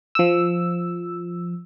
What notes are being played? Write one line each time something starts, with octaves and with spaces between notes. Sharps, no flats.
F3 E6